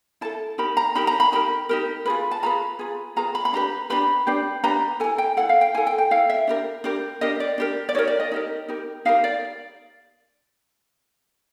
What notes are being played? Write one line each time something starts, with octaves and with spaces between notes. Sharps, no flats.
E4 A4 A5
D#4 G4 A#4 B5
A#5
D#4 G4 A#4 B5
A#5
B5
D#4 G4 A#4 B5
D#4 G4 A#4
F4 G#4 B4
A5
F4 G#4 B4 A#5
F4 G#4 B4
F4 G#4 B4 A#5
B5
B5
D4 G4 B4 A#5
D4 G4 B4 B5
D4 G4 B4
D4 G4 B4 A#5
E4 A4 G#5
G5
E4 A4 F#5
F5
G5
E4 A4 G#5
G5
G5
E4 A4 F5
E5
D4 G4 A#4
D4 G4 A#4
D4 G4 A#4 D#5
D5
D4 G4 A#4
D5
D#4 G4 A#4 C#5
D5
D#5
D#4 G4 A#4
D#4 G4 A#4
D#4 G4 A#4 F5
D5